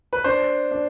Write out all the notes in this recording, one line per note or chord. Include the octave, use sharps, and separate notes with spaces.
B4
D4 C5
D4